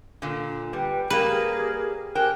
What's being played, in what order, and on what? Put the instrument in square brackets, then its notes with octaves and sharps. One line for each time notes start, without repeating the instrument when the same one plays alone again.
[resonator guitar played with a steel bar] A#2 D3
[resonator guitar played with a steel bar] G3 [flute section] B4 G5
[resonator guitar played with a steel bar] G3 A#3 [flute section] G4 G#4 A#4 [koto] B4
[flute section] G4 G#5 F#6 [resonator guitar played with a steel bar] A#4 C5 G5